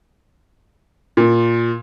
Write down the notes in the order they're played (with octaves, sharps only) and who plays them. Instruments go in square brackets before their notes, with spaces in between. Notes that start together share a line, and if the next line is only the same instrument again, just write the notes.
[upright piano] A#2